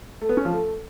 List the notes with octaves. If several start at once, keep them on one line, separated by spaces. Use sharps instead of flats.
A3
B3
C#4
F3
A3